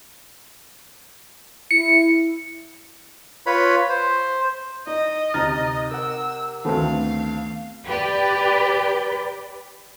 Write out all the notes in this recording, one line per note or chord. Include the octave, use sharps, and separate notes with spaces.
E4 C#7
F4 B4 C#5 B5
C5
D#4 D#5
D2 C3 D#4 A#5 F6 A6
A#4 F#5 E6
D2 D#3 A3 B3 C4 F5
G4 B4 D5